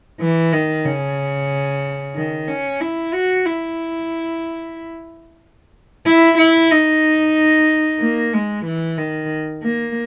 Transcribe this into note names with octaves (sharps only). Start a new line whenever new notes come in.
E3
D#3
C#3
D#3
C#4
E4
F#4
E4
E4
E4
D#4
A#3
G#3
E3
D#3
A#3